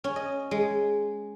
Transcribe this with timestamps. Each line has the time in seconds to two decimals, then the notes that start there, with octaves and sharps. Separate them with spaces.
0.04 C#4
0.16 D#5
0.51 G#3